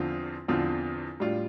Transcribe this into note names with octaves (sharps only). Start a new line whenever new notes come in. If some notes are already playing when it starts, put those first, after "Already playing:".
Already playing: E2 D3 F3 C4 F4
E2 D3 F3 C4 F4
A2 G3 D4 F4